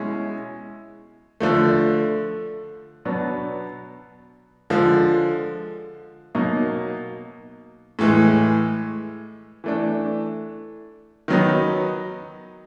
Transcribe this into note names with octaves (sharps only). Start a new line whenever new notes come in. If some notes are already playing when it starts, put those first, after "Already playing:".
Already playing: B2 G#3 C#4 E4
D3 F3 A3
B2 F#3 B3 D4
D3 F3 G#3
B2 F#3 A#3 D#4
A2 E3 G#3
E3 A3 D4
D#3 F#3 B3 D#4